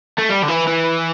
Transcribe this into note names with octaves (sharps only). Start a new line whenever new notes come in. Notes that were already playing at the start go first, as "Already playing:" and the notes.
A3
G3
D3
E3
E3